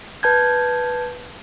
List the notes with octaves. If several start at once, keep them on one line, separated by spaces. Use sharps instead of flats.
B4 A5 G6 G#6